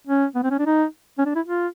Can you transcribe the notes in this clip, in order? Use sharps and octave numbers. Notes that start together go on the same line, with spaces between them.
C#4
B3
C4
C#4
D4
D#4
C#4
D4
E4
F4